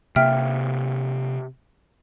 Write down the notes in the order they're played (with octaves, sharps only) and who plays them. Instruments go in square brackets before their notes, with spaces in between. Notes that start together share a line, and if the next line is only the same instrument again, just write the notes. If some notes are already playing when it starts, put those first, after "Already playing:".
[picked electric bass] C3 A#3 [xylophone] E5 G5 F6